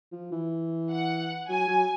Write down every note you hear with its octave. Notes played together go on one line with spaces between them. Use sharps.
F3
E3
F#5
F#3 G#5
F#3